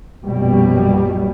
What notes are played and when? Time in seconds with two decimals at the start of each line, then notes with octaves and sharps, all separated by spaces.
0.22 A#1 F#2 B2 F#3 G3